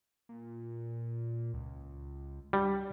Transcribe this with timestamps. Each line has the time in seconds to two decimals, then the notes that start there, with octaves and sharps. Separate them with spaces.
0.29 A#2
1.54 C#2
2.53 G3 D4